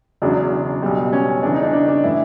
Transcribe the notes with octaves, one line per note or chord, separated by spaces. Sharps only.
E1 E2 C#3 F#3 D4
B1 B2 G3
C#4
E2 C#3 E3 D4
D#4
D4
D4
D4
A2 E3 E4